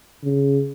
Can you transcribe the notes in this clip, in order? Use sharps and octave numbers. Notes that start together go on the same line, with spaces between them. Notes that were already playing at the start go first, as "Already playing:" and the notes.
C#3